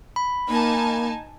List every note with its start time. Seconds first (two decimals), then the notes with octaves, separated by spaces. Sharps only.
0.16 B5
0.49 A#3 D#4 G#5 A5